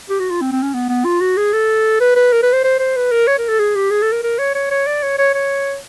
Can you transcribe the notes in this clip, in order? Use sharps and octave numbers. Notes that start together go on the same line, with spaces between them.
G4
F#4
F4
C4
C4
C#4
B3
B3
F4
F#4
G#4
A4
B4
B4
A#4
B4
C5
C5
C5
B4
A#4
C#5
A#4
A4
G#4
G4
G#4
A4
A#4
A#4
C#5
C#5
C#5
D5
C#5
C#5
C#5